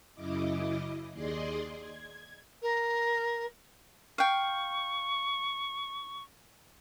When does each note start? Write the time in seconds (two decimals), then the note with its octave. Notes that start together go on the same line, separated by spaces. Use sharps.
0.15 F#2 C#3 E4 D#5 D6
1.12 D#2 G#4 D5 D#5 C6
1.78 G#6
2.62 A#4
4.18 F5 G5 C#6